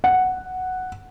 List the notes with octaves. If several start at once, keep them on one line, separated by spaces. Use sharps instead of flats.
F#5